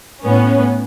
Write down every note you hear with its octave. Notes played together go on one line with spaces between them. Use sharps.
A2 B3 C#4